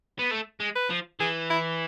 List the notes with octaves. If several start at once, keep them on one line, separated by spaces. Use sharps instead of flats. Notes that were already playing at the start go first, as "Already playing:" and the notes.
B3
A3
G#3
B4
F3
E3 G#4
E4